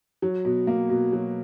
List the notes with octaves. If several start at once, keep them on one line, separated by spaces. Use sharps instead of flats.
F#3
B2
A#3
B2
F#3